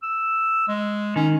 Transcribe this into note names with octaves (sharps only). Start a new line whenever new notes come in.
E6
G#3
D#3 C#4